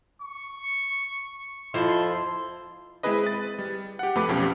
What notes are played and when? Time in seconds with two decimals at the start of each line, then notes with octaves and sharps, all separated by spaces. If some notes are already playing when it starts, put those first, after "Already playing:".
0.22 C#6
1.74 F2 F3 E4 C6
3.03 G#3 C4 E4 G#4 B4 D#5
3.24 B4 A6
3.59 G3
3.99 G4 F#5
4.15 F2 A3 B4 D6
4.29 B1 F2 C#4 G4 D6